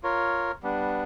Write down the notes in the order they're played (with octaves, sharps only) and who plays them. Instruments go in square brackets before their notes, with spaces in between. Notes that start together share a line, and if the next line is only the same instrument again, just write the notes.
[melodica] F4 A#4 C#5
G3 B3 D4